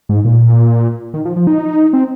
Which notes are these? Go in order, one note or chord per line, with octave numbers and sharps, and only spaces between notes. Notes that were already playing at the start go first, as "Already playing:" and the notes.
G#2
A#2
D#3
F3
F3
D#4
C4